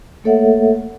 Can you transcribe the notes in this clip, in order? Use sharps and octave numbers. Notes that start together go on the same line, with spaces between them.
A3 A#3 A4 C#5 E5 F#5